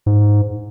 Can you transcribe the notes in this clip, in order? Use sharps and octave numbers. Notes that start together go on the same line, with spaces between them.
G#2